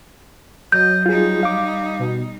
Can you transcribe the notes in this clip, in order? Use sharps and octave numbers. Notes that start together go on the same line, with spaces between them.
F#3 D#5 G6
G3 D#4 F4 G#4
F5 D6
B2